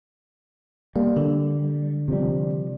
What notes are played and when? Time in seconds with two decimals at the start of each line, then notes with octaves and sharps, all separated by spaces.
0.96 G3 A#3
1.16 D3
2.08 C3 F3 G3